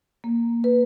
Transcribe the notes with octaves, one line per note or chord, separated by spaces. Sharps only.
A#3
B4